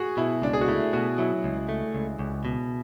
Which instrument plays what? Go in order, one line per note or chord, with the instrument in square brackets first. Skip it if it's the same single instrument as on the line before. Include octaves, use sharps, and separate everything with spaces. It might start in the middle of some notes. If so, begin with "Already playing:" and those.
Already playing: [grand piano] F#4 G#4
[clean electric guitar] B2 [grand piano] E4
[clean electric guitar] C#2 [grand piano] D4
[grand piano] G#4
F#4
[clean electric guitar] A3 [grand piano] E4
[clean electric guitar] B2 [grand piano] F#4
[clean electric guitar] F#3 [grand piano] E4
[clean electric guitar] C#2
A3
C#2
C#2
B2